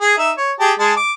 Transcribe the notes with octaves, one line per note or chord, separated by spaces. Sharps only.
G#4
D#4 E5
C#5
G4 G#4 A5
G#3 G#4 A5
D6